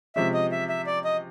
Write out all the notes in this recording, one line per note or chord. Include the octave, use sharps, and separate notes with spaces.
C3 F3 G#3 C#4 E5
D#5
E5
E5
D5
D#5